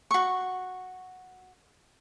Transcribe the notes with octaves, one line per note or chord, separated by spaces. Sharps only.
F#4 C#6